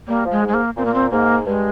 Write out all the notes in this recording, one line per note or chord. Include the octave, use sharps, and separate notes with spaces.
G3 A#3
F3
G#3
G#2
G#3
A#3
A#2 C4
A#3
C4
G#2 A#3
G2 G#3